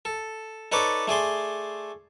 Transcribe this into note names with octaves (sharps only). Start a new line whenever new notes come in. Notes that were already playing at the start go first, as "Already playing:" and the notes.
A4
D#4 A4 B4 C#5 D5 D6
A3 G#4 D5 C6